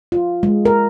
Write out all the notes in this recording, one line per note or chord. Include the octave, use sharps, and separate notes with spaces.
F4
G#3
A#4